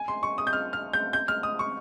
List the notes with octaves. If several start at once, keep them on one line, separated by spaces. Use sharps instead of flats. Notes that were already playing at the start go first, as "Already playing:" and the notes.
Already playing: G#5
C6
C#6
D#6
G6
F6
F6
G6
G6
F6
D#6
C#6